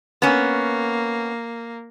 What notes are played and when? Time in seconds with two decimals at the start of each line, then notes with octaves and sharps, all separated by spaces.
0.22 A#3 B3 C#4